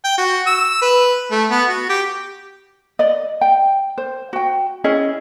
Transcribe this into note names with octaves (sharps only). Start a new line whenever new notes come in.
G5
F#4
E6
B4
A3
B3
F#4
G4
D5 D#5
G5
C5
F#4 G5
C#4 E4 G#4 D#5